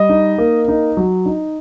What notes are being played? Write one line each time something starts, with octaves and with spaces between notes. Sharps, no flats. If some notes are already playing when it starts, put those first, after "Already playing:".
Already playing: G3 D#5
D#4
A#3
D#4
F#3
D#4